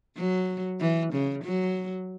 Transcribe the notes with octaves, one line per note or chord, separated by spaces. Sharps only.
F#3
E3
C#3
F#3